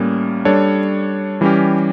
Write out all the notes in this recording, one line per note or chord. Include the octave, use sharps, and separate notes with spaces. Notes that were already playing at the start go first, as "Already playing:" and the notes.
Already playing: A2 G3 A#3 C#4
G3 D4 A4 C#5
E3 G3 C#4 G4